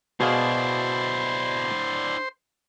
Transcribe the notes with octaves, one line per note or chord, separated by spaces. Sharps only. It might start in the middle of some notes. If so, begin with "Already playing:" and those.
B2 D4 E4 G#4 C5 F5